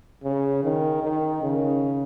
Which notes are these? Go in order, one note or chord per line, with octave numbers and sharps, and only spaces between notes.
C#3
D#3
D#3
C#3